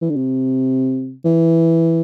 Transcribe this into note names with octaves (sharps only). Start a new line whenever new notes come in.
E3
D3
C3
E3